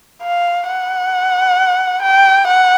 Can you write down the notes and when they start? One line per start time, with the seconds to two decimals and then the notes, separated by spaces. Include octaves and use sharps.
0.22 F5
0.67 F#5
2.03 G5
2.47 F#5